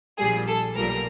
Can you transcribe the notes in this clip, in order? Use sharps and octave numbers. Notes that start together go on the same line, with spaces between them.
A#1 A#2 G3 G#4
A4
B1 A#2 G3 A#4